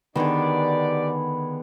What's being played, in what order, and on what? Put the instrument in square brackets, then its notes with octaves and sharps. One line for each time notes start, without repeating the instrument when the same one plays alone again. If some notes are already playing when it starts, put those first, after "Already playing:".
[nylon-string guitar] D3 D#3 [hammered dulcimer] B3 G#4 [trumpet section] D4 G4 D5